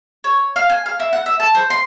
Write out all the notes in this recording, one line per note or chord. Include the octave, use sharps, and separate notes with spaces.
C#5
F5
G#5
F5
E4
F#5
E5
A5
C5
C6